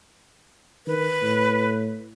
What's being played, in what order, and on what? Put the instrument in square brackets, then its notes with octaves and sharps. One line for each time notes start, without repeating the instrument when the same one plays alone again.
[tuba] D#3 [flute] B4
[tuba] A2